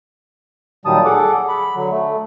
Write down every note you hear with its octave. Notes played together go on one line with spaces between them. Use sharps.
A#2 D#3 F#3 G3 A5 D#6
G#4 A4 F#5 D6
B5
D3 F#3
A3